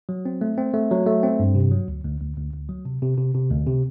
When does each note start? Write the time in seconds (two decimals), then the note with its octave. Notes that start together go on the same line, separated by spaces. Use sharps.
0.09 F#3
0.25 C4
0.41 A3
0.58 C4
0.74 A3
0.91 F#3
1.06 A3
1.23 C4
1.39 G2
1.55 C3
1.72 F#3
1.88 D2
2.04 D2
2.21 D2
2.37 D2
2.53 D2
2.69 F#3
2.85 C3
3.02 C3
3.17 C3
3.34 C3
3.50 D2
3.66 C3